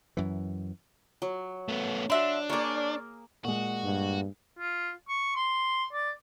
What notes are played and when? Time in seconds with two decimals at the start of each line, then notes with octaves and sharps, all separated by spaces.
0.17 F#2 E3
1.22 F#3
1.68 A3 B3
2.10 D4 F#4 E5 C6
2.49 A#3 G#4 A#4 C#5 D5
3.45 A#2 G#3 F#4
3.84 G2
4.59 F4
5.09 C#6
5.36 C6
5.93 D5